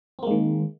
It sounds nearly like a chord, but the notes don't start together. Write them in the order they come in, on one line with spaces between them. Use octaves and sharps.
C4 A#3 G#3 D#3